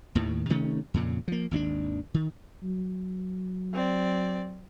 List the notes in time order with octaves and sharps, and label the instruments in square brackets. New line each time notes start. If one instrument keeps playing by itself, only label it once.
[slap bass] D#2 A2 D#3
C3 D#3 A3 C#4
F2 A#2 C#3
F3 A#3
G#1 D#2 C#4 D4
D#3
[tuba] F#3
[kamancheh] C4 D5